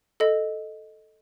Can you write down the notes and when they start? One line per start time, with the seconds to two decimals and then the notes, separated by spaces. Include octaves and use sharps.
0.20 A4 D#5